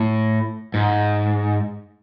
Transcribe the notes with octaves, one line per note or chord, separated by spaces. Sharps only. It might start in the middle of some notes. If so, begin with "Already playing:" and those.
Already playing: A2
G#2